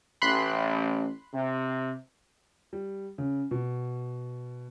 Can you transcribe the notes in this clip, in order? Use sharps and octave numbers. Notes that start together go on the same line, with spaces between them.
A1 B5 C6 F#6
C3
G3
C#3
B2